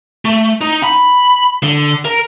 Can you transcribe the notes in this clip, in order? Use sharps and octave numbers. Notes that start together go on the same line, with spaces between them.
A3
D#4
B5
D3
A#4